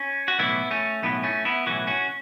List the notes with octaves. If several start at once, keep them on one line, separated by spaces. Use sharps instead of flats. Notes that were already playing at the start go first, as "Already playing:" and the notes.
Already playing: C#4
F#4
B1 A2 E3 B3 E4
A3 C#4
B1 A2 E3 B3
A3 C#4
B3 E4
B1 A2 E3 C#4 F#4
C#4 F#4